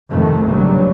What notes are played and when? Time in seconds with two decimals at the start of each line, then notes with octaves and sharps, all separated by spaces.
0.10 F2 G#2 C3 D#3 A3
0.47 A#1 G2 C#3 F#3 G3